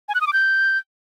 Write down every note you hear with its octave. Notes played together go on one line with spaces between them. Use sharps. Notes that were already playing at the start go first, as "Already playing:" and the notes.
G#5
F#6
D#6
D6
G6